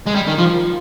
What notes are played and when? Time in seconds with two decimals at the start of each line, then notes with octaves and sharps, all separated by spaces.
0.07 G#3
0.16 G3
0.28 D#3
0.38 F3 F4